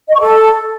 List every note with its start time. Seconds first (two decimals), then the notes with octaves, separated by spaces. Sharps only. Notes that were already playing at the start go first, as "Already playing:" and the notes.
0.08 D#5
0.14 C#6
0.20 A4